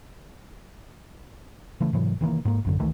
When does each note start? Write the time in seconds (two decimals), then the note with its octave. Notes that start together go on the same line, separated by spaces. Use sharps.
1.81 C#3 E3 A3
1.93 G#2 C3 E3 F#3
2.21 C3 D#3 E3 A#3
2.45 G#2 A#3
2.65 A1 F#2 D3
2.80 C#2 D#3 E3 A3